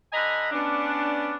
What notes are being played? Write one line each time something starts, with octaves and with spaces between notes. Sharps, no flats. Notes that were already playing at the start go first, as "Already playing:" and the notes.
D3 D#5 G#5 A#5 B5
B3 C#4 D4